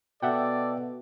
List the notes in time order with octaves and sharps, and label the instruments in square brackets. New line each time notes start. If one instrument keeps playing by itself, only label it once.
[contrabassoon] B2 [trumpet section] A4 D5 [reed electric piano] E5 F#5 G5